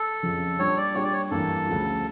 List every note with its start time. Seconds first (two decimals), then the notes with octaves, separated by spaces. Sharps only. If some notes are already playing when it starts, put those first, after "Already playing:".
Already playing: A4
0.23 F2 C#3 F3
0.58 A#2 G3 D4 C#5
0.77 D5
0.94 A#2 G3 D4 G4 C#5
1.04 D5
1.13 C#5
1.31 G2 E3 G3 A#3 D4 A4
1.67 D2 C#3 F3